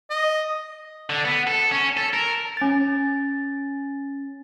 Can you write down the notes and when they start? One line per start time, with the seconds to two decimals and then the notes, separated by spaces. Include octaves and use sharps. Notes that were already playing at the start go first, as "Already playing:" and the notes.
0.10 D#5
1.10 D3
1.25 B3
1.47 A4
1.71 C#4
1.97 A4
2.13 A#4
2.57 C#4 A6